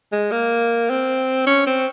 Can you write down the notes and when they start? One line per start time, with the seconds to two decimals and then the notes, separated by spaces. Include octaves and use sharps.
0.12 G#3
0.32 A#3
0.90 C4
1.47 C#4
1.67 C4